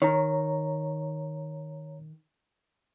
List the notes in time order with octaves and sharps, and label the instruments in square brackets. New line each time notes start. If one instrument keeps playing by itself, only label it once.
[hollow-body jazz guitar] D#3 [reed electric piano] C#5 A#5